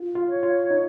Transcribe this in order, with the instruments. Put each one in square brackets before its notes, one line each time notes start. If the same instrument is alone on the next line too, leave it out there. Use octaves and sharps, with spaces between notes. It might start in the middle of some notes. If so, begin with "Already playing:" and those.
Already playing: [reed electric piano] F4
F4
[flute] C#5
[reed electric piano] F4
D#4